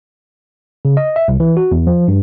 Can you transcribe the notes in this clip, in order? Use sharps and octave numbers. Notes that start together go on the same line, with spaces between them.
C#3
D#5
E5
C2
E3
F#4
E2
F3
G2